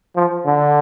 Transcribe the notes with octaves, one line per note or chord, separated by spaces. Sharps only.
F3
D3